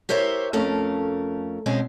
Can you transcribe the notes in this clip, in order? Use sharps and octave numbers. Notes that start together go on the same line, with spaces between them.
G4 A#4 C5 C#5 E5
F2 A3 C#4 A#4 F5
B2 G#3 C4 C#4